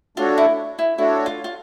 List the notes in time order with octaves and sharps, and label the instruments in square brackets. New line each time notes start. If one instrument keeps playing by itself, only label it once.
[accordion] A3 D4 F#4 A4 C#5 [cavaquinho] F4
[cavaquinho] E4
E4
[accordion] A3 D4 F#4 A4 C#5 [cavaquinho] E4
[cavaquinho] F4
F4